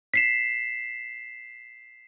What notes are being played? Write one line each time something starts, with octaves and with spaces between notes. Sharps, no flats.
B6 C7 E7